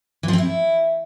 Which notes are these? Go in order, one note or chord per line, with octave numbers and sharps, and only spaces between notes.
E3
F3
C4
E4